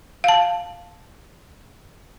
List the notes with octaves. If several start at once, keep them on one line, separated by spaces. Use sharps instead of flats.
F5 A5